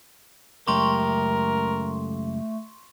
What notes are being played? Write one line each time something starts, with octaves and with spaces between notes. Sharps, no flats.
C#2 F#2 A3 G4 A#4 C6 C#6